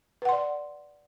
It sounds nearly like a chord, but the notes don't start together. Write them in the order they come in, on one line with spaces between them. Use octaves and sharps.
B4 F#5 C6 D5